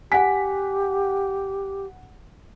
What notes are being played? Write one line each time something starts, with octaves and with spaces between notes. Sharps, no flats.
G4 F#5 G#5 B6